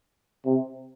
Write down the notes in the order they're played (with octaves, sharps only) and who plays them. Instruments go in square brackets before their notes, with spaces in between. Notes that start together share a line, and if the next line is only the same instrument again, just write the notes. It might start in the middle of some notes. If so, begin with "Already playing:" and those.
[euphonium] C3